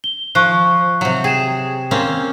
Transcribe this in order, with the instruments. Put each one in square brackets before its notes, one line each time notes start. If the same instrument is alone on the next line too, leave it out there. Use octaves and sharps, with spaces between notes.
[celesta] G7
[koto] F3 [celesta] C#6 F#6
[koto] C3 F#3
[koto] G#4 [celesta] G5 E7
[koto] A#3 C4 C#4